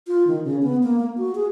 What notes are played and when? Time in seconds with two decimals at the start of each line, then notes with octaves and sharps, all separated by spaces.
0.07 F4
0.27 D#3
0.45 C#3
0.62 B3
0.83 A#3
1.00 A#3
1.18 F#4
1.35 G#4